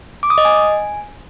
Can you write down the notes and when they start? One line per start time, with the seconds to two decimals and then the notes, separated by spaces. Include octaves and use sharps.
0.23 D6
0.30 D#6
0.38 D#5
0.45 G#5